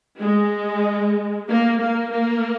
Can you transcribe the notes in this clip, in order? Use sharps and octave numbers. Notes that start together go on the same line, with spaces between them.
G#3
A#3
A#3
A#3